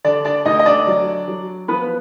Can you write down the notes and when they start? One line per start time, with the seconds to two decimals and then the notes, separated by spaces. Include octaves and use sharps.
0.04 D3 D4 D5
0.25 D4 D5
0.45 D2 D#4 D#5
0.59 D#5
0.66 D4 D5
0.87 F#3
1.28 F#3
1.68 F3 B3 B4